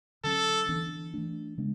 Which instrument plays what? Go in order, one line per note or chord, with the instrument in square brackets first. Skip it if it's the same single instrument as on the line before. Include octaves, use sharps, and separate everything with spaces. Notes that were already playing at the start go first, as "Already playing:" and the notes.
[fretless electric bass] D3 F#3 C#4 [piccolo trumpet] A4
[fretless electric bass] E3 B3 D4
E3 A3 D4
C#3 G#3 B3 D4